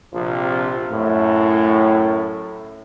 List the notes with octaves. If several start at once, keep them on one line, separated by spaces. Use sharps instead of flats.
A#1 C3 F3 C4 F4
F#2 A2